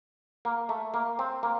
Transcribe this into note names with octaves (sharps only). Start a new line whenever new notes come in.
A#3
A3
A#3
C4
A#3